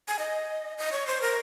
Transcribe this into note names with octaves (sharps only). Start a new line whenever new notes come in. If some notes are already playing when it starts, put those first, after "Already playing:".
G#5
D#5
D#5
C#5
C5
A#4